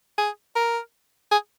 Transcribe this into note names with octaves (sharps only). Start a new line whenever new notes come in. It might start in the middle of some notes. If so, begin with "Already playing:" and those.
G#4
A#4
G#4